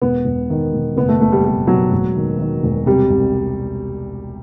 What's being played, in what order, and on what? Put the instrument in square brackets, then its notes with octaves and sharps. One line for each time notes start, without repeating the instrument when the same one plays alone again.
[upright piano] E1 B3
E1
D#3
E1
F#1 B3
A3
F#1 A3
G3
B2 G3
B2 F#3
E1
D#3
D#3
E1
C3 G3
C2